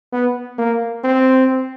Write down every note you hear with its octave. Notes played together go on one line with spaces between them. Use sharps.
B3
A#3
C4